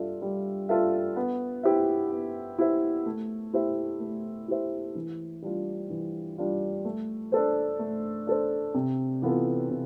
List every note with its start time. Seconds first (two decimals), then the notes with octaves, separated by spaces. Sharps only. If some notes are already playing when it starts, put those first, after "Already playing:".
Already playing: G3 D4 F4 A4 E5
0.22 G3
0.69 D4 F4 A4 E5
1.16 B3
1.63 E4 G4 C5 E5
2.12 B3
2.59 E4 G4 C5 E5
3.06 A3
3.53 E4 G4 C5 E5
4.00 A3
4.48 E4 G4 C5 E5
4.95 E3
5.42 G3 D4 F4
5.90 E3
6.38 G3 D4 F4
6.85 A3
7.32 D4 A4 C5
7.79 A3
8.27 D4 A4 C5
8.74 C3
9.22 E3 B3 F4 A4
9.70 C3